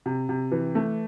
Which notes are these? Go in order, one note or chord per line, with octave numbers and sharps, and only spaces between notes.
C3
C3
E3
A3